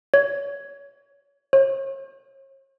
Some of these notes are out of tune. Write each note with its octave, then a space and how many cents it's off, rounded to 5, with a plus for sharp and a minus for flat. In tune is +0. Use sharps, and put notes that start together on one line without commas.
C#5 +30
C#5 -40